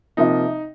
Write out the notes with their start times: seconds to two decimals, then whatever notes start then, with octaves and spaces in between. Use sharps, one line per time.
0.17 C3 F3 A#3 D#4